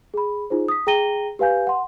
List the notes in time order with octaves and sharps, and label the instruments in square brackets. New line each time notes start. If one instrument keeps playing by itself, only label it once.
[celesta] G#4 B5
D#4 F4 G#4 C5
D#6 B6
G#4 G5 A#5 A#6 D#7 G7
G4 B4 F5 G#5 G6
F#5 C6